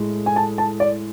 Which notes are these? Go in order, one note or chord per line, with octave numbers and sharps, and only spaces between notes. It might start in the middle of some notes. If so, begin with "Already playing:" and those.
Already playing: A2 G#3
G#5
A5
A5
D5